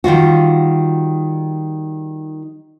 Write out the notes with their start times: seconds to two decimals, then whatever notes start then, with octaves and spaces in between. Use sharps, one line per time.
0.04 D#3 G3 F4 F#4